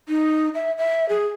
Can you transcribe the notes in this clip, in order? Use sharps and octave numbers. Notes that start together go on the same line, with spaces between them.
D#4
E5
E5
G#4